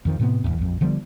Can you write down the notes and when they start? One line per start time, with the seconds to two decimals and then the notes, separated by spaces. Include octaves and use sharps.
0.05 F2 D#3 F3
0.20 A2 C3 G3 B3
0.44 D1 A1 E2
0.59 A#1 F2
0.81 D3 F3 G3 B3